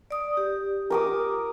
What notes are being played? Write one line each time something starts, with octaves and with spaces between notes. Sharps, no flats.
D5 D#6
G4
A#4 D6 D#6